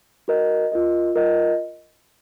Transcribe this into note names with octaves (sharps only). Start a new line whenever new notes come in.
F#4 A#4 D#5
F4 A#4 D#5
F4 A#4 D#5